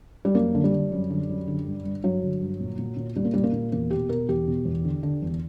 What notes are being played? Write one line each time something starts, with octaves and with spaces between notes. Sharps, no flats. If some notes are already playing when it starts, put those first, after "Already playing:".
G3
F#2 A#3
D3
G3
D3
F#2
D3
F#2
D3
G2
G2
G2 F#3
D3
G2
A#2
A#2
A#2
A#2 G3
A#3
A#2 G3
A#3
A#2
E2 A#3
B2 G4
B2 A#4
E2 G4
B2
E2
D3
D3
E2